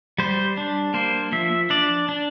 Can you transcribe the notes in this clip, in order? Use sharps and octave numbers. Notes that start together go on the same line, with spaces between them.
G3 C5
D4
A#3 C5
F3 E5
D4 D5
D4